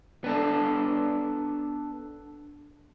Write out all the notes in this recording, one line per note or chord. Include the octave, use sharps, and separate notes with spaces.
B3 D4 A4